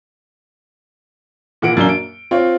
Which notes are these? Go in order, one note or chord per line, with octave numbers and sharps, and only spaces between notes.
A#2 E3 F#5 D7
F#2 A#3 D4 G7
D7
C4 F4 C#5